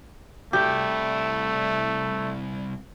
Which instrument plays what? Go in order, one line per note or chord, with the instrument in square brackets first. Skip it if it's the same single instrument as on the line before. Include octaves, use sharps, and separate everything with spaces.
[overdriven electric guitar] C2 E4 [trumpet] A3 [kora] G4